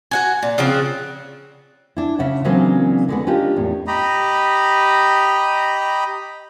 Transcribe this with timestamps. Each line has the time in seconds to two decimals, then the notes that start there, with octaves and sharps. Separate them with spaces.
0.11 F#4 F#5 G#5
0.43 A#2
0.58 C#3 F3 C4 F#4
1.96 D4 E4
2.19 C#3 E5 F#5
2.45 C#3 E3 F#3 A#3 C4 D4
3.09 D3 G#3 B3
3.27 C#4 D4 F4 G4 A#4 D#5
3.56 E2 A2
3.87 G4 D#5 A#5 B5